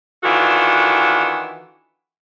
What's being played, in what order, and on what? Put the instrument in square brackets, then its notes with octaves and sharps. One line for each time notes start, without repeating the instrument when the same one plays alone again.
[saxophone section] D#3 E3 D4 F4 F#4 A4